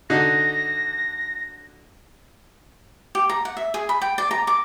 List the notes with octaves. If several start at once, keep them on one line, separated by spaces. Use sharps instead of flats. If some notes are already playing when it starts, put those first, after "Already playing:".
D3 D#4 F#4 A#6
G4
A#5
F#5
E5
G#4
B5
G5
D5
A#5
D6